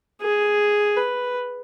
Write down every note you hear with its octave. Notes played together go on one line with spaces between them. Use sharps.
G#4
B4